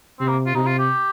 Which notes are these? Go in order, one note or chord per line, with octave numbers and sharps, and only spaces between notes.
C3 C4
A#3
F4
C3 D#4
F4
G4